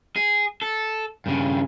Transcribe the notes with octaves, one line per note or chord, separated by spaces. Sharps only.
G#4
A4
G2 C#3